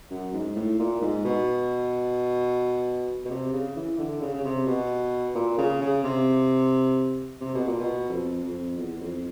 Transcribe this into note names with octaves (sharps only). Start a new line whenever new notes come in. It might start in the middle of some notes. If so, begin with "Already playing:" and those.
F#2
G#2
A2
A#2
G#2
B2
B2
C3
C#3
E3
D3
C#3
C#3
C3
B2
A#2
C#3
C#3
C3
C3
B2
A#2
B2
F2
F2
E2
E2
F2